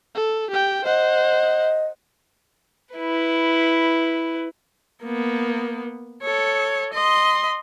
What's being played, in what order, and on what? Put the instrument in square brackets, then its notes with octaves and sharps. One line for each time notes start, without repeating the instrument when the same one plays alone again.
[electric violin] A4
G4 G5
[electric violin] C5 F#5 [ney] D#5
[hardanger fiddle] E4 B4
[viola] A#3 B3
A4 C#5
D#5 C6